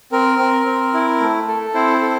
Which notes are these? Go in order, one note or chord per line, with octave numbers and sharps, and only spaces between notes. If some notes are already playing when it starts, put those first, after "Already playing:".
C4 A#4
C4
C4
E4
A3
A4
C4 E4 C5
A4